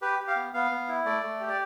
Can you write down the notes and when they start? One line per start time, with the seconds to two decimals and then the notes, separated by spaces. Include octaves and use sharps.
0.02 G4 B4
0.19 G4
0.27 F5
0.36 B3
0.54 B3 F5
0.71 B3
0.88 E4
1.06 A3 D5
1.23 A3
1.40 G4
1.49 D5